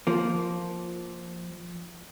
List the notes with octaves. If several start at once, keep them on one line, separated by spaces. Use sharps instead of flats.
F3 A#3